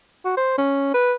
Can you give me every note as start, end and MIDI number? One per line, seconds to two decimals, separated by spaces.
0.25 0.34 66
0.37 0.53 72
0.58 0.90 61
0.94 1.14 71